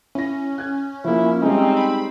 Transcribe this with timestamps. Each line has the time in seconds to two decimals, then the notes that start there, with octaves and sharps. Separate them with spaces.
0.15 C#4 E4 A#6
0.58 F#6 G#6
1.04 F3 A#3 E4
1.42 G3 G#3 C4 D#4
1.77 B5